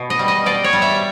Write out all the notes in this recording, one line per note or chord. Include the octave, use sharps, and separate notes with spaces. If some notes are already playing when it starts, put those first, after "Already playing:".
Already playing: B2
D#5
G3
D#5
B2 D5
C#5
G3
E5